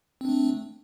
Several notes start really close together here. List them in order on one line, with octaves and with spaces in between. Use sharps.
C4 D4 A3